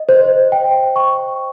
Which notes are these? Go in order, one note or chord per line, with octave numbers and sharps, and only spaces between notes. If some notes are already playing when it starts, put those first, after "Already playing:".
Already playing: D#5
C5
G5
C#6